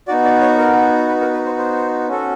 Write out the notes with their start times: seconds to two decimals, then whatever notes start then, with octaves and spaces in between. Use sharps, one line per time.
0.08 B3 D#4 F#4 D5
0.25 D5
0.42 C#5
0.58 A#4
1.08 B4
1.21 A#4
1.34 B4
1.46 C5
1.58 C5
2.08 C#4 F#4 A4